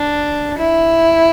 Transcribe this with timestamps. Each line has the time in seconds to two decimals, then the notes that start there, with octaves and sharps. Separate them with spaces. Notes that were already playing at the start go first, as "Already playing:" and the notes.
Already playing: D4
0.58 E4